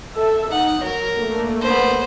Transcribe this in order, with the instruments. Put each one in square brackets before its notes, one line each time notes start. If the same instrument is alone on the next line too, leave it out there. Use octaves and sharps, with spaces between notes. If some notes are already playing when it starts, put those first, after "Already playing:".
[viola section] A4 E5
[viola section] D#4 [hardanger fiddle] F#5
[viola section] F#3 [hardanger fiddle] A#4
[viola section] A3 A#3 D4
[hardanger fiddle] B3 C5